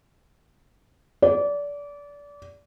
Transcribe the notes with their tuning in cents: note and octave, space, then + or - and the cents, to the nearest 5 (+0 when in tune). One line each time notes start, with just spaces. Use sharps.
D5 -25